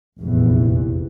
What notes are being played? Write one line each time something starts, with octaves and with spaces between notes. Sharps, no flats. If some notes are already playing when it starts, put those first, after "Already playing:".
F1 A#1 E2 E3